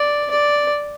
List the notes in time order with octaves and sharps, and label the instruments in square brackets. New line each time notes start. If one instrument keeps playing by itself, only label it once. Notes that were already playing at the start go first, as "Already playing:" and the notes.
Already playing: [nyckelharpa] D5
D5